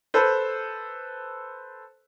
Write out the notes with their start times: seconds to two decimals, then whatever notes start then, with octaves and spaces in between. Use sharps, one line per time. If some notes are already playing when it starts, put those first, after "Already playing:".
0.14 A4 B4 C5